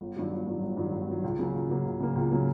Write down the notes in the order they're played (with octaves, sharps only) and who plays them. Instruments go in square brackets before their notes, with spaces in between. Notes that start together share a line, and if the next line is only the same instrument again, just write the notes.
[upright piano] G1
G2 D#3 F#3
G1
G2 D#3 F#3
G1
G2 D#3 F#3
G1
G2 D#3 F#3
C#2
C#3 F#3 A#3
C#2
C#3 F#3 A#3
C#2
C#3 F#3 A#3
C#2
C#3 F#3 A#3